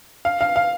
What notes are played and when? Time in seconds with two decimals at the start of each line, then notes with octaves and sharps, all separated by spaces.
0.25 F5
0.41 F5
0.56 F5